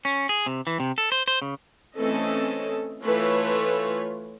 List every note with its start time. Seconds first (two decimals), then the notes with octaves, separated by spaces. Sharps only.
0.05 C#4
0.29 G#4
0.46 C3
0.67 E3
0.80 C3
0.98 A4
1.12 C5
1.28 C5
1.42 C#3
1.97 E3 A3 C4 C#4 A4 D#5
3.04 E3 A3 F4 B4 C#5